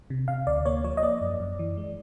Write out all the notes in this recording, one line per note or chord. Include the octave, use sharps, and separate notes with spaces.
C3
C3 F5
D2 D5
A#3 C#5
F3 C#5
D#5
A#3 D5
F#2
F#2
E3
G#3